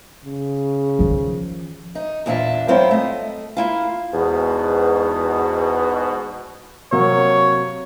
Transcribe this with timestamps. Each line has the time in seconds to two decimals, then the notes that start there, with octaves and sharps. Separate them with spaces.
0.25 C#3
0.99 D#3 F3
1.95 D#4
2.26 E2 A#2 D4 E5
2.68 A2 F#3 B3 C4 E4 F4
2.91 A3 D#5
3.57 A#3 E4 F4
4.13 E2 G#2 B2
6.92 C3 F#3 A#3 C#5